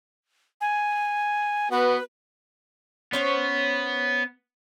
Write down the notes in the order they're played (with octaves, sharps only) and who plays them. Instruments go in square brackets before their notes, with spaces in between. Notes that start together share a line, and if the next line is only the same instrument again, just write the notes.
[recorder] G#5
[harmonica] B3 F#4 [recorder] B4
[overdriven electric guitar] B3 [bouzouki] C#4 C5 C#5